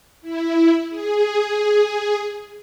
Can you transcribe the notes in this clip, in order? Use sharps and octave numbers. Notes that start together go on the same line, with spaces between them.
E4
G#4